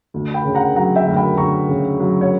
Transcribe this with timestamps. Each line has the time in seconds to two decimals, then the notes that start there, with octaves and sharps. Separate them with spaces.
0.14 D2
0.34 G5 B5
0.45 C#3
0.55 F#5 A#5
0.76 F#3 F#5 A#5
0.96 E5 G5
1.07 D2
1.17 G5 B5
1.37 D2 A#5 C#6
1.69 C#3
2.00 F#3
2.21 C#5